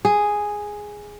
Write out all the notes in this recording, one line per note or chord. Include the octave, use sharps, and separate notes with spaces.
G#4